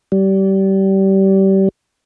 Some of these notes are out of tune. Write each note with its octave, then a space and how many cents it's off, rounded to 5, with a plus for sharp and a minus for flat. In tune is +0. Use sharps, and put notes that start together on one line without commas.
G3 -25